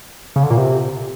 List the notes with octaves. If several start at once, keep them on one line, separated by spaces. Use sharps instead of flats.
C#3
D3
A#2
C3